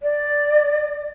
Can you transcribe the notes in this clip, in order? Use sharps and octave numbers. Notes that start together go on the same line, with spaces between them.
D5